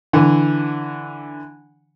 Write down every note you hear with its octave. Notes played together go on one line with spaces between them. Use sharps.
D3 E3